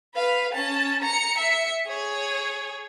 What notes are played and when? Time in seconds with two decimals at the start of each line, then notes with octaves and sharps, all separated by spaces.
0.16 B4 F5
0.53 C#4 A5
1.03 A#5 C#7
1.38 E5 C#7
1.87 G#4 C#5